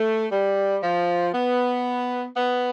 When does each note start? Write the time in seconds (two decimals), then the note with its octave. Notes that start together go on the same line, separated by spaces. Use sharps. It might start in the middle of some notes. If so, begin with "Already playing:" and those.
Already playing: A3
0.32 G3
0.83 F3
1.34 B3
2.37 B3